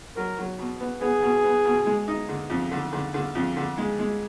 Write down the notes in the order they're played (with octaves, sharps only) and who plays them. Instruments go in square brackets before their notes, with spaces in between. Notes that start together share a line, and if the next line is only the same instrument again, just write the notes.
[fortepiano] F#3 [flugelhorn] A#4
[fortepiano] F#3
B2
B3
[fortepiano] B3 [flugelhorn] G#4
[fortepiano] B2
B3
B2
G#3
D#4
D3
F2
D3
D3
D3
F2
D3
G#3
G#3